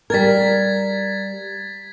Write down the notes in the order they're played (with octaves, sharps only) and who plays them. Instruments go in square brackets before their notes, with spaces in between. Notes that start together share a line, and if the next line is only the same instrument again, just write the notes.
[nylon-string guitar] G3 A#4 [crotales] G#6 A6 B6